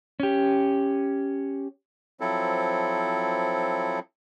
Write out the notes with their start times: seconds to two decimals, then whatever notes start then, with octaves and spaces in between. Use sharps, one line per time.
0.20 C#4 G4
2.20 F3 F#3 C4 E4 A4